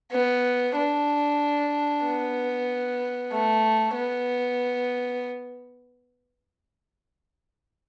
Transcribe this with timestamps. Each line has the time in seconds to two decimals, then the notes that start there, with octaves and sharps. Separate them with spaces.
0.12 B3
0.76 D4
2.04 B3
3.32 A3
3.95 B3